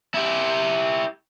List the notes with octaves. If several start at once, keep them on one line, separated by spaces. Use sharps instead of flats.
E4 G4